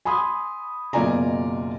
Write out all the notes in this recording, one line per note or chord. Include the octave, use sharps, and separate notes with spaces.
G#5 B5 C6 D#6
F#1 B2 F4 D5 G#5 A#5